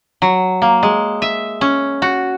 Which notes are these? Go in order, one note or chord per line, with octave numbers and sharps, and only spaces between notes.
F#3
A#3
G#3
E5
C#4
F#4